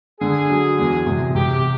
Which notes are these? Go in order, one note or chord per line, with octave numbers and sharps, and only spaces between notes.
D3 G#4
F#3
E2
C3
C3 G4